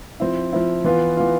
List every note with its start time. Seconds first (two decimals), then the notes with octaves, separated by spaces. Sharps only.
0.20 F3 C4 E4
0.53 F3 C4 E4
0.84 E3 B3 F4
1.17 E3 B3 F4